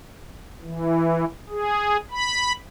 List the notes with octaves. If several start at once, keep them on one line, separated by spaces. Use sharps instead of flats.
E3
G#4
B5